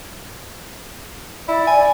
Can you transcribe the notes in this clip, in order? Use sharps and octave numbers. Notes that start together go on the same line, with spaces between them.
E4 D5
G#5